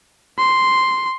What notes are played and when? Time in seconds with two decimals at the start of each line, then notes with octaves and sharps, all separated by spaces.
0.38 C6